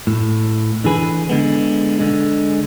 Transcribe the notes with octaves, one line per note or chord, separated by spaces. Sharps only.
A2
D3 E3 G#4 B4
D3 G#3 B3
D3 G#3